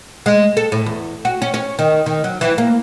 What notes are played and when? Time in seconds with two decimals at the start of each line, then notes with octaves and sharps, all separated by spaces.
0.26 G#3
0.57 A4
0.72 A2
0.86 E2
1.25 F#4
1.42 C#4
1.54 C#4
1.79 D#3
2.06 D#3
2.24 F#3
2.41 E3
2.58 A#3